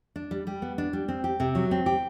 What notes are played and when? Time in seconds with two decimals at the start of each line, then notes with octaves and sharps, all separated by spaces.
0.16 D4
0.31 G3
0.47 G3
0.62 B3
0.78 D4
0.93 G3
1.08 C4
1.24 G4
1.40 C3
1.55 F#3
1.71 C4
1.86 G4